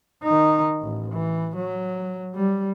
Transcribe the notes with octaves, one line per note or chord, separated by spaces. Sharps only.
D#3 D#4
A1
E3
F#3
G3